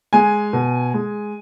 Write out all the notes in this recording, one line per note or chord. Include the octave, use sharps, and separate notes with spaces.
G#3 G#5
B2
G#3